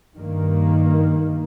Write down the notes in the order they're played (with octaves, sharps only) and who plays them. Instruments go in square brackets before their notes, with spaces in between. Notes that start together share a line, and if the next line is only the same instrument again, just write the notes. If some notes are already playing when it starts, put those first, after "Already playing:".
[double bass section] G2 D#3 A#3